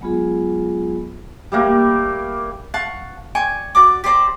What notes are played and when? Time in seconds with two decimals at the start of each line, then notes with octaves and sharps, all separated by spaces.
0.01 F#3 G#3 B3 F4 G#4
1.52 G3 A3 A#3
2.74 F5 F#5 A5 C#6
3.35 D5 G5 G#5 C#6
3.75 F#4 D5 D6
4.04 G4 C5 D5 A#5